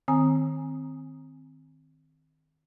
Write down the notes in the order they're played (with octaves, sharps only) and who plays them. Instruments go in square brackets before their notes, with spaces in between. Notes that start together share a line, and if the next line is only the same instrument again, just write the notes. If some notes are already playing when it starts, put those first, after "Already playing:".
[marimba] D#3 C4 G#5 A#5 D#6